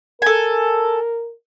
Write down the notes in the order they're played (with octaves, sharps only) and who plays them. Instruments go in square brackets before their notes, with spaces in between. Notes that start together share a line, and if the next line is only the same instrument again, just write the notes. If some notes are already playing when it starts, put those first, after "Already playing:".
[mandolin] A4 G#5 [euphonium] A#4